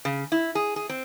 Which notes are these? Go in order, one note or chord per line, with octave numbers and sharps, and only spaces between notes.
C#3
E4
G#4
G#4
C4